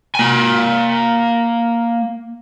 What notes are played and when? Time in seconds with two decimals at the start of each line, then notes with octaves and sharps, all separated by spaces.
0.15 A#3 G#5